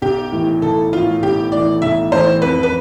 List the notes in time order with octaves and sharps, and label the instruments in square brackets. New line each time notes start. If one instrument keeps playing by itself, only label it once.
[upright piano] B1 [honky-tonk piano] G4
[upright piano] A2 E3
[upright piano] B1 [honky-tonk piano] A4
[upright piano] A2 E3 [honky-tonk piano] F4
[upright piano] B1 [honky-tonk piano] G4
[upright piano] A2 E3 [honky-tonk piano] D5
[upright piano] B1 [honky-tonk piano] E5
[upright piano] A2 E3 [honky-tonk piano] C5
[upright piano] F2 [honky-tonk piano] B4
[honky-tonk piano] B4